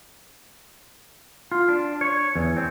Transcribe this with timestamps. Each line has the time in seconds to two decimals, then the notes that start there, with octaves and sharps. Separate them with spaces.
1.51 F4
1.69 D4
2.01 C#5
2.36 E2
2.57 C4